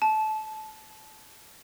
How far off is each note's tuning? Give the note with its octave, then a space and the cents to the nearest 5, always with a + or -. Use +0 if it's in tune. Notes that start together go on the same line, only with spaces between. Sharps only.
A5 -20